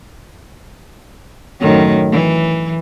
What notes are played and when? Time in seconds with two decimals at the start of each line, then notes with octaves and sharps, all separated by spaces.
1.60 F#2 A2 D#3
2.12 E3